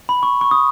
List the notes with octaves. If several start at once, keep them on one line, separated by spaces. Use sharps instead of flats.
B5
C#6
C#6
D#6